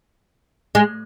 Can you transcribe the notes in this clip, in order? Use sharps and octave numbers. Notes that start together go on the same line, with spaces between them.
G#3